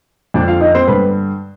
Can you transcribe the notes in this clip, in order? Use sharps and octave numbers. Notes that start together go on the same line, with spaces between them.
F2 D3 D4 D5
F4 F5
D#4 D#5
C4 C5
G2 D3 B3 B4